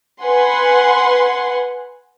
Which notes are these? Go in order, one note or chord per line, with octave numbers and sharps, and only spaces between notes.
B4 F#5 G#5 C6